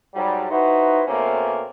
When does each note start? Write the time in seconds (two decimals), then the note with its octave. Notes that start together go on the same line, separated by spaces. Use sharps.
0.14 G#2 F#3 G3
0.50 D#4 E4 F#4 B4 C5
1.07 B2 A3 A#3 C4 C#4